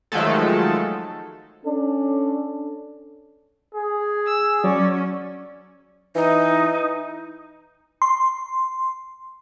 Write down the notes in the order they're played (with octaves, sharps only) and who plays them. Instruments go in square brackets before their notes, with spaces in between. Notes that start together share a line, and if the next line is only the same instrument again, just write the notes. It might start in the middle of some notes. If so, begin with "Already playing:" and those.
[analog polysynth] D#3 F3 F#3 G#3 A3 A4
[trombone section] C#4 D4 A4
[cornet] G#4
[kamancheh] E6
[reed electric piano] F#3 [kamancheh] C#4 [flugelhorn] D5
[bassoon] E3 [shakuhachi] D#4
[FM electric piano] C6